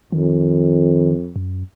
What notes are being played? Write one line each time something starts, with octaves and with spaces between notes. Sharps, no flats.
F2 D#3
F#2